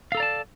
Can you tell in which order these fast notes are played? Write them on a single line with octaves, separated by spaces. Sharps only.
F5 A4 A#5 D5 A5